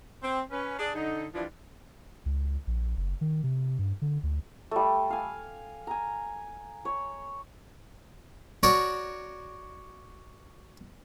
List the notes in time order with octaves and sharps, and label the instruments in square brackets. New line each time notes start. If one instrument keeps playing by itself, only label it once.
[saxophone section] C4
C#4 B4
D4 G#4
D3 D#4
E3 F3 G3 D4 E4 F4
[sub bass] C#2
A#1
F#1
D#3
C3
G2
D3
D2
[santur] G3 A3
F5 G#5
G#5 A#5
C#5
[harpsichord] F#4 A#4 C#5 D5 F#5